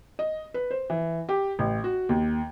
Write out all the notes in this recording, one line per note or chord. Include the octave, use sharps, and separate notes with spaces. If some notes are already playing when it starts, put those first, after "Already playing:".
D#5
B4
C5
E3
G4
A1
F#4
D#2